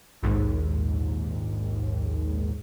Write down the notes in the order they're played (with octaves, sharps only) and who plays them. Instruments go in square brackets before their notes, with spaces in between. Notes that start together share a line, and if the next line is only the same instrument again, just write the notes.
[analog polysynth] A#1 D#2 G#2